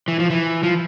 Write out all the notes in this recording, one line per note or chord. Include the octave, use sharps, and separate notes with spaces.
E3
F3
E3
F3